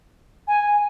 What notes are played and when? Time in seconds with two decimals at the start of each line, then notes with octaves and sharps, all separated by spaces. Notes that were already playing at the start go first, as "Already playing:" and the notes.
0.48 G#5